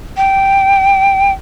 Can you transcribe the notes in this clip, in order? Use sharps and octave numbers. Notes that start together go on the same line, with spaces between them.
G5